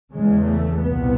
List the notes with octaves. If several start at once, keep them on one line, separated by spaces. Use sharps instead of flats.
E2 C#3 G#3
A3
C2 A#2 B3